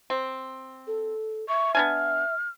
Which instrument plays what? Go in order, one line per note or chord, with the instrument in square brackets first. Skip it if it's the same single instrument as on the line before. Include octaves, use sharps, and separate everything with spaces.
[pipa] C4
[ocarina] A4
[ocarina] E5 [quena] C#6
[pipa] B3 D4 G#5 [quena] F6